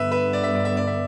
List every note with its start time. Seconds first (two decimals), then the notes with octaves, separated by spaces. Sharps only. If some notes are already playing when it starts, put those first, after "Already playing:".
Already playing: G2 D3 B3 B4 E5
0.11 B4 E5
0.33 D5
0.43 E5
0.55 D5
0.65 E5
0.77 D5
0.87 E5